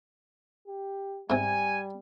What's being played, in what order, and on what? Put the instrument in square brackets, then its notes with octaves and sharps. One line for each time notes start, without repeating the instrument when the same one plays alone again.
[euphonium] G4
[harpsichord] G#2 C3 [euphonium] G3 [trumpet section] G#5